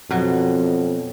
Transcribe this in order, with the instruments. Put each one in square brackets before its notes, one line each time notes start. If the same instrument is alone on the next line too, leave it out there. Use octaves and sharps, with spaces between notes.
[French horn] F2 [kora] B2 F#3